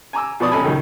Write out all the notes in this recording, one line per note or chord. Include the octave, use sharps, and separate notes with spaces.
G#5 A#5 D6 E6
B2 F3 B4 D5 C#6 D#6
G#1 C#4 A4 G#5 B5
C#2 D#3 F#3